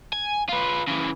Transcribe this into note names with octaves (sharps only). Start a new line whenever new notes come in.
G#5
F4 B4
C#3 E3